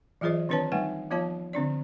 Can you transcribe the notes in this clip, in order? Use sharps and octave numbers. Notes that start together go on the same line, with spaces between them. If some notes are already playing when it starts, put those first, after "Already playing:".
E3 F#3 F4 G#4 C5 D#5
D#3 C4 D4 B4 C#5 A5
G3 A3 D#4 B4 F#5 G#5
F3 B3 F4 C#5 F5 A5
D3 C4 D4 D5